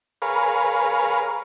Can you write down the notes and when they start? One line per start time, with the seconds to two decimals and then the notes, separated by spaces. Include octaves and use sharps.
0.22 G#4 A#4 B4 C#5 F5